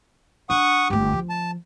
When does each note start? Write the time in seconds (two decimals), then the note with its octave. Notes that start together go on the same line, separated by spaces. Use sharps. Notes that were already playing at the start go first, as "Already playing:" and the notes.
0.50 D4 F#5 C#6 D#6
0.90 G1 A3 G4
1.13 F3
1.30 A5